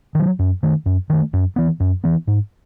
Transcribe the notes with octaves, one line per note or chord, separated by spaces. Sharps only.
D#3 F#3
F#2
D#3 A3
F#2
D#3 A3
F#2
E3 B3
F#2
E3 B3
G#2